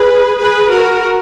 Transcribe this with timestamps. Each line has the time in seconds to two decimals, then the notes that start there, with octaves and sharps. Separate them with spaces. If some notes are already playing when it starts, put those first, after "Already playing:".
Already playing: G#4 B4
0.40 G#4 B4
0.71 F#4 A#4